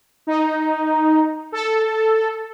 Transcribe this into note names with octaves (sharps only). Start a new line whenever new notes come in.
D#4
A4